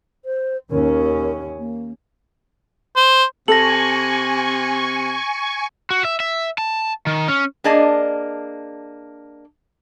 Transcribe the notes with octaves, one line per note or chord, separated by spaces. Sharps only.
C5
D#2 C#4 A#4
A#3
C5
C3 A4 G#5 C#6 A#6 F#7
F#4
E5
E5
A5
D#3
C#4
A#3 D4 G#4 D5 D#5 A5